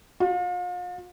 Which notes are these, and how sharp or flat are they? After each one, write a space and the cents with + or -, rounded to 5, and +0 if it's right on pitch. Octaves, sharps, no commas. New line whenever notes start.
F4 +40